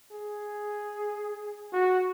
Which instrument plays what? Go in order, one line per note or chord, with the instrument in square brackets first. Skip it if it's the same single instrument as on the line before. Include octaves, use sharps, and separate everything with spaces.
[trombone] G#4
[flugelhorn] F#4